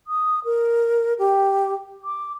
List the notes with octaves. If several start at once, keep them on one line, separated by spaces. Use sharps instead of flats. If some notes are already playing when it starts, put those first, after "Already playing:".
D#6
A#4
G4
D6